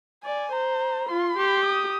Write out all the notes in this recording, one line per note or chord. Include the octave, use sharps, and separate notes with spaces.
D5 G#5
C5 A#5
F4 C6
G4
D#6